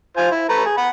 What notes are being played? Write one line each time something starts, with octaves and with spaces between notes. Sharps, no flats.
F4 C5 G#5
E4
A3 B4 A#5
G#4
F#5 B5